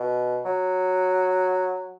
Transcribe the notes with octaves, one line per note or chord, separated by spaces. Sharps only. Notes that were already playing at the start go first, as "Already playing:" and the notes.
Already playing: B2
F#3